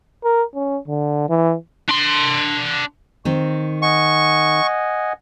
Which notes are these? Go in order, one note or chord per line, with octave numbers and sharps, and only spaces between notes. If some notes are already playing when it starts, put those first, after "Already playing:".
A#4
C#4
D3
E3
D4 C6
D#3 C4 C#6
D#5 F#5 G#5 C#6